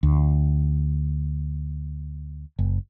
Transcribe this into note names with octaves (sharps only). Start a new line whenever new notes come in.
D2
F#1